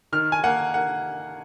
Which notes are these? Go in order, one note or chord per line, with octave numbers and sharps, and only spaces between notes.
D#3 F6
G#5
A#3 F#5
A#3 F#5